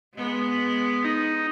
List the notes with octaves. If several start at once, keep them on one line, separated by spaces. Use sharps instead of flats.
G#3 B3
D#4